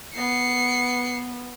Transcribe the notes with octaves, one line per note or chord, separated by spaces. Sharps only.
B3 C7 C#7